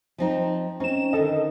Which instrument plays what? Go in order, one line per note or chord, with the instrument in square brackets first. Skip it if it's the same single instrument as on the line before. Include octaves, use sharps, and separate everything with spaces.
[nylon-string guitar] F3 C4 D#4
[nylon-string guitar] C4 D#4 [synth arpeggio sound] C#4 E7
[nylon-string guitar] D3 D#3 [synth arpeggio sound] A4 D#5